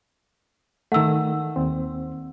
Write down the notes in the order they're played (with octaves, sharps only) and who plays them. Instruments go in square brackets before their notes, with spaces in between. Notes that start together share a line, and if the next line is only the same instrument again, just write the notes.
[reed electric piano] D#3 A3 [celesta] F#5 E6
[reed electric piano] D#2 C4